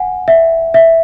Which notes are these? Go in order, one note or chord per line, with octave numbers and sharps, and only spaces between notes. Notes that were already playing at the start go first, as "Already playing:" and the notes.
Already playing: F#5 G#5
E5
E5